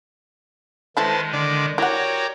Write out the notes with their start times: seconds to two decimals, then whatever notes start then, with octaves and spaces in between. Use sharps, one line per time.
0.97 D#3 G#3 A3 E4 A4 B4 C5 A5
1.33 D3 D5
1.78 E4 F#4 G4 A#4 C#5 D5 F#5